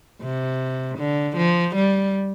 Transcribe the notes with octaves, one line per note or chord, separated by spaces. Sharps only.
C3
D3
F3
G3